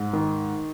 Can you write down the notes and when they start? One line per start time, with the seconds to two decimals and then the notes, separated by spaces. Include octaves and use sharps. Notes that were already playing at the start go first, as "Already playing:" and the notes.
Already playing: G#2
0.13 D#3